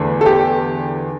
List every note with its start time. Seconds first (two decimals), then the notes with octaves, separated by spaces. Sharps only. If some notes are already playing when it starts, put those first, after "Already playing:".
Already playing: E2 D3 A3
0.21 A4
0.26 G4